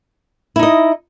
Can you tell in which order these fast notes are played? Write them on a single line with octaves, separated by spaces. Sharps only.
E4 D#4 D#5